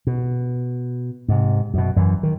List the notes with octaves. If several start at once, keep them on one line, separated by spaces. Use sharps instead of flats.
B2
G#2 C3
F#2 B2
F#2 E3
D#3